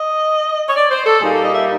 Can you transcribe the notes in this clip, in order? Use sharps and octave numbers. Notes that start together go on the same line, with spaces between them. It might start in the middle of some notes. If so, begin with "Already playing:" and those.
Already playing: D#5
C#5
D5
C5
A4
A#2 G3 A#3 D#4 G#4
A4
D#5
E5